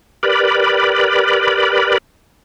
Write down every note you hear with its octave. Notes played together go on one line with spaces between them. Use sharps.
G4 A#4 B4 D5 B5